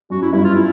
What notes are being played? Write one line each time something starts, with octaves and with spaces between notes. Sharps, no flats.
F#2 F#4
E4
G2 E4
F4
E4